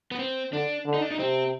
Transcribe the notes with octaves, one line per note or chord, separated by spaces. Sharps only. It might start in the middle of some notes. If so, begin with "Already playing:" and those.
B3
C4
D3 D4
D3
D#4
D4
D#4
C3 C4